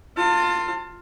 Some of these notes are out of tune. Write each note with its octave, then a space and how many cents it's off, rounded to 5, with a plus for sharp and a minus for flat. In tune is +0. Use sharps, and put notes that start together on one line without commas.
F4 +5 A5 +35